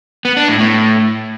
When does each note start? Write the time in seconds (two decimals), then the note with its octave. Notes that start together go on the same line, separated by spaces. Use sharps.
0.25 B3
0.37 D4
0.48 A2
0.60 A2